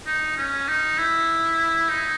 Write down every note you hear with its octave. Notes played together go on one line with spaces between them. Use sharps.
D#4
C#4
D#4
E4
D#4